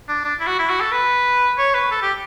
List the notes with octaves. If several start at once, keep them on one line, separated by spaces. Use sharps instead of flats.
D4
D4
E4
F#4
E4
F#4
A4
B4
C#5
B4
A4
G4